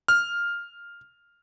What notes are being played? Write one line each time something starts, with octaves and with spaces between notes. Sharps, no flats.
F6